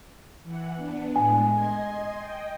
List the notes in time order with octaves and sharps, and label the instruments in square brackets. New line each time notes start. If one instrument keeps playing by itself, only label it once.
[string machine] E3 F#5
B3 D4
[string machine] A2 G#3 [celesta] G#5
[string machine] D#5 C6 G#6
D#5 G5